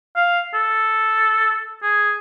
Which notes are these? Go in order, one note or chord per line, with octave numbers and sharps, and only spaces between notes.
F5
A4
G#4